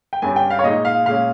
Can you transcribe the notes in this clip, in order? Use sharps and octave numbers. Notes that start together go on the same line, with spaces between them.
G5
G2 G3 C#4 G#5
G5
F5
C#5
A#2 G#3 D#4 D#5
F5
A#2 G#3 C#4 F5